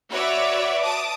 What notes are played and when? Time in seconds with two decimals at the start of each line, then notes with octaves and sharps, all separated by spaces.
0.11 F#4 B4 C#5 D5 E5
0.84 A5 D6 D#6